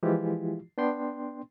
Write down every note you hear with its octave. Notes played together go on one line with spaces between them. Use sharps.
E3 F3 G#3 E4 F4 G4
B3 D4 G5 C6